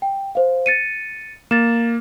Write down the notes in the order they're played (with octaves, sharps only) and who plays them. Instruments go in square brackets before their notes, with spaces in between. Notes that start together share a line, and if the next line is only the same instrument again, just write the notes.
[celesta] G5
C5 F5
A6 C#7 D#7
[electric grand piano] A#3 [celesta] A6 E7